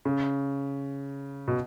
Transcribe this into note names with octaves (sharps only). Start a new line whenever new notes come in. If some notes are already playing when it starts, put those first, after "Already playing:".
C#3
B2